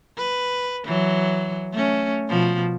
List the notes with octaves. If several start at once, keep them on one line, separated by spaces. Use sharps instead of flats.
B4
E3 F#3
A3 C#4
B2 F3